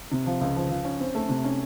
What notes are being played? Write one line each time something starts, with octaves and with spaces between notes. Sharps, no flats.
C3
F3
C#2
F3
F3
C#4
C4
A3
C3
C#4